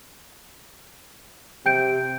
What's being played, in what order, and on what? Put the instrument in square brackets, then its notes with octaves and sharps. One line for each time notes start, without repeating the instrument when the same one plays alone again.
[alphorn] C3 [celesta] G5 G6 D7